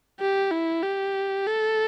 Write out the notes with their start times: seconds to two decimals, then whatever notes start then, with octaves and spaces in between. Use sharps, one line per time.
0.20 G4
0.51 E4
0.83 G4
1.47 A4